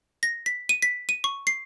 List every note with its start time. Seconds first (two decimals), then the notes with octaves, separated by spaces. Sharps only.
0.23 A#6
0.46 B6
0.69 D#7
0.82 B6
1.09 D#7
1.24 C#6
1.47 C7